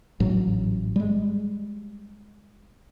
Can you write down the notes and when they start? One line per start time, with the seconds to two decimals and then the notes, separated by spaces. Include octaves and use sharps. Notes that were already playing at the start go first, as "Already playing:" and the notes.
0.20 A1 G#2 F#3
0.96 G3 G#3